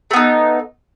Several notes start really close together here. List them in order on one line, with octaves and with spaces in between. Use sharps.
A3 B3 D#4